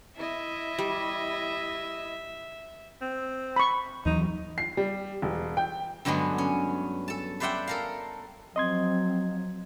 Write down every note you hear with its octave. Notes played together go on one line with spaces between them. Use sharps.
E4 D#5 E5
G3
C4
B5 C#6
D#2 E3 F#3 D#4
C7
G3
E1
G5
G2 D3 F#3 G#3 B3
C#4
A4 A5
B4 C5 D5 E5 F#5 G5
A4 A#4 F5
F3 F#3 C4 D#5 C6 G#6